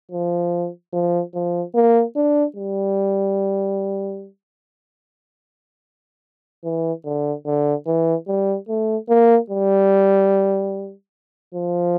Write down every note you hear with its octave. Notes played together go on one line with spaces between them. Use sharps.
F3
F3
F3
A#3
D4
G3
E3
D3
D3
E3
G3
A3
A#3
G3
F3